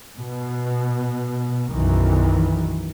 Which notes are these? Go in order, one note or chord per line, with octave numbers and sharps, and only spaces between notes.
B2
B1 F#2 D#3 E3